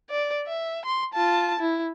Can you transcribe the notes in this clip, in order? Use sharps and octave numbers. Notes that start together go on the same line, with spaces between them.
D5
E5
C6
F4 A5
E4